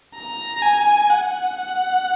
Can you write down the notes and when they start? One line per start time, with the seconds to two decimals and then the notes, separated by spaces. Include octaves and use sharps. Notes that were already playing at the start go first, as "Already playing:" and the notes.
0.15 A#5
0.62 G#5
1.10 F#5
1.57 F#5